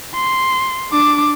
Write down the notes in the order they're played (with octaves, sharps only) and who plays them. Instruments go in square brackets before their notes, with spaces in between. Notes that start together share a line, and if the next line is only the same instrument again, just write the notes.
[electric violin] C6
D4 D6